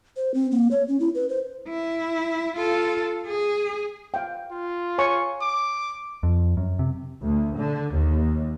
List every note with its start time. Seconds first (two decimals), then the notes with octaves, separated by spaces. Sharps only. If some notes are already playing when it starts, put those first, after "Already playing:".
0.17 C5
0.34 C4
0.51 A#3
0.71 C#5
0.88 C#4
1.00 E4
1.15 B4
1.29 C5
1.68 E4
2.56 F4 A4
3.27 G#4
4.14 F5 G5
4.51 F4
4.98 C#5 G#5 C#6
5.41 D6
6.23 F2
6.57 F#2
6.79 C3
7.23 D2
7.56 D3
7.93 D#2